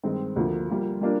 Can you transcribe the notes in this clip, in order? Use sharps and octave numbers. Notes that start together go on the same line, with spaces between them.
G2 D#3 G#3 C4
D2 D3 F3 A#3
G3 A#3 F4
G3 A#3 D4 F4 A#4